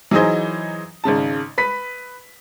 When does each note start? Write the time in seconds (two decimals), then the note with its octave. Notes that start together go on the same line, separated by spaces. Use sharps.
0.11 E3 F#3 D#4 G#4 C5 D#5
1.04 G#1 G#2 C#3 A5
1.58 B4 B6